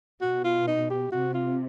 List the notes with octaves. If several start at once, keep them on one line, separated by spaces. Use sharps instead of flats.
B2 F#4
F4
D#4
G4
C3 F#4
F4